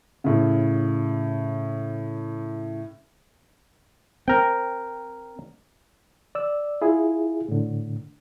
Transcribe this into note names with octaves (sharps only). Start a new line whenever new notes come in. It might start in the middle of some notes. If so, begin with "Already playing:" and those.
A2 C#3
C4 A#4 G5
D5 E6
E4 F4 G#4
A2 D3